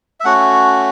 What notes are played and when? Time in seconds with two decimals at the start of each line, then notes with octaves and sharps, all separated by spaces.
0.20 E5
0.24 A3 C#4 F#4 F#5